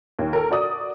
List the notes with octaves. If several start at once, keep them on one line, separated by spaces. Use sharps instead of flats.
D#2
A4 A#4
F#4 D5 D#6